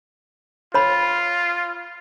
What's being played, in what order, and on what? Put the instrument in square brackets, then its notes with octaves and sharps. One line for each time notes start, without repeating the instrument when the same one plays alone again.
[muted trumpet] F4 [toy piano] C#5 B5